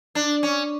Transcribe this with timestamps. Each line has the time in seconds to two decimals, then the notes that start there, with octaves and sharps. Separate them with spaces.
0.15 D4
0.43 C#4